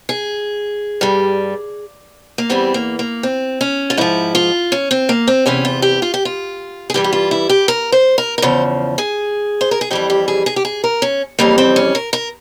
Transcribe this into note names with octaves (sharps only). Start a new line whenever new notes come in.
G#4
G2 G3
A#3
E2 E3 G3 C4
A#3
A#3
C4
C#4
F4
G#2 F3 E4
F4
C#4
C4
A#3
C4
E2 C3 E3 C#4
F4
G4
F4
G4
F4
G#4
G2 E3 G3 G4
G4
F4
E4
G4
A#4
C5
A#4
A#4
E2 C#3 F3 C5
G#4
C5
A#4
G#4
F2 E3 G3 G4
G4
G#4
G#4
G4
G#4
A#4
C#4
F2 C#3 E3 G3 A#3
C4
C#4
A#4
A#4